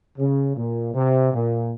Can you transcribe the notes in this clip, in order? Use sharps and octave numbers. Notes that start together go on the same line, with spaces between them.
C#3
A#2
C3
A#2